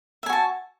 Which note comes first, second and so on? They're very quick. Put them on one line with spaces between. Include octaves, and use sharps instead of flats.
E5 G#5 F#4 A5